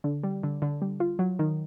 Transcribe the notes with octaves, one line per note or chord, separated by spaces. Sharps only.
D3
G3
D3
D3
G3
F4
F#3
D#3